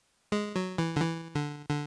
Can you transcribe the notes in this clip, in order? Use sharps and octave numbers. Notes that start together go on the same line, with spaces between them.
G#3
F#3
E3
D3
E3
D3
D3